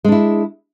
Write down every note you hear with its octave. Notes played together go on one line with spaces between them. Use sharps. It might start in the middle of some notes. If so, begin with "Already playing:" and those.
G#3 D4 E4